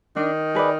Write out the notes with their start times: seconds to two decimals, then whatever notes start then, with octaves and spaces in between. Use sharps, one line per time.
0.16 D#3 D4
0.55 G#4 B4 D5